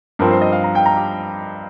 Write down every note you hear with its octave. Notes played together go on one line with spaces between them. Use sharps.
G2 F3 C4 A#4
C5
D#5
F5
A#5
G5
A#5
G4